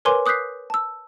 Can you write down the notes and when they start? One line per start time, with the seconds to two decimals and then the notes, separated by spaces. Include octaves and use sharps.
0.05 A#4 B4 C#5 G#5 C6 D6
0.26 D6 D#6 F#6 G6 B6 C7
0.70 A5 E6